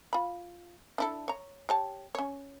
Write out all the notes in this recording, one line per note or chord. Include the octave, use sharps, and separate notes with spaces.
F4 B5
D4 E4 A4
C#5 A#5
G4 C#5 A5
C#4 C#5